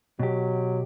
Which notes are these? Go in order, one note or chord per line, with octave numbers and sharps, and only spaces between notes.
B2 F#3 G4